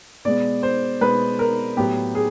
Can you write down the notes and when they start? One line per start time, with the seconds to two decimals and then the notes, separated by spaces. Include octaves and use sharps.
0.25 B2 G#3 B3 D5
0.63 C5
1.01 B2 G#3 B3 B4
1.39 A#4
1.77 A2 F#3 B3 G4
2.15 G#4